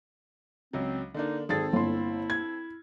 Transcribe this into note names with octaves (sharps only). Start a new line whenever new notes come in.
C#2 F#3 C4
D3 A#3 D4 D#4
G#1 C4 G#4 A4 A6
G1 A#3 E4 C6
G#6